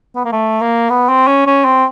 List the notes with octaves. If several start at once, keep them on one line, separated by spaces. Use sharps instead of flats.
B3
A#3
A3
A#3
B3
C4
C#4
C#4
C4